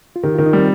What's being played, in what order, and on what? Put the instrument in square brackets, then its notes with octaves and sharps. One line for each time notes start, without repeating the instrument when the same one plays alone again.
[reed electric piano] F4
[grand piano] D#3 [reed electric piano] G4
[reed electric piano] F4
[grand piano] D#3
[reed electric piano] D#4
[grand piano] G3 [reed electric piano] C4